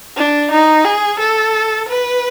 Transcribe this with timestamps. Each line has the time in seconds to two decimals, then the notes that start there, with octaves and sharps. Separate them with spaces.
0.16 D4
0.51 D#4
0.85 G#4
1.19 A4
1.89 B4